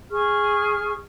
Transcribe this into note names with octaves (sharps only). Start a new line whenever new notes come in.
G#4 C#6 F6